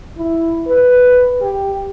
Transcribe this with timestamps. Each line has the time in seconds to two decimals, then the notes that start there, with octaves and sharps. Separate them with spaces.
0.17 E4
0.67 B4
1.41 G4